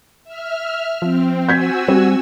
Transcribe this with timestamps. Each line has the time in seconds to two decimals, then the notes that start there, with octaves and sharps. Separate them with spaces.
0.24 E5 F6
1.02 F3 C4
1.49 F#4 G#5 E6 G6 G#6 B6
1.88 G3 C4